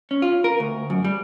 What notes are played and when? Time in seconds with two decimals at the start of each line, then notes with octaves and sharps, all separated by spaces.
0.11 C#4
0.22 F4
0.44 A#4
0.60 D2
0.90 F#2
1.05 G3